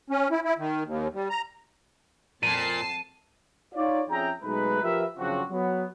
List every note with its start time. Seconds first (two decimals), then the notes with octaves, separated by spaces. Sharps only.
0.10 C#4
0.31 E4
0.44 E4
0.58 D#3
0.85 D#2
1.13 G3
1.30 A#5
2.43 F2 A#2 A5 C7 D#7
3.74 D#4 F4 C#5 D5
4.10 F2 C#4 G#4 E5 G5 A#5
4.43 B1 G#3 A3 D#4 B4
4.83 F3 G4 A#4 B4 E5
5.17 F#2 C#3 F3 C4 D4 F#4
5.50 F#3 B3